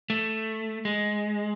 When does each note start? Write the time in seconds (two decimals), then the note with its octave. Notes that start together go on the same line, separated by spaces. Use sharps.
0.10 A3
0.85 G#3